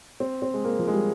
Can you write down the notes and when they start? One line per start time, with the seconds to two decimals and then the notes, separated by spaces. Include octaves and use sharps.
0.20 C4
0.42 C4
0.54 G#3
0.65 A#3
0.79 F3
0.87 G#3
0.93 G3